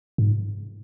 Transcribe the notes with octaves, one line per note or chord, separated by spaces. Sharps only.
G#2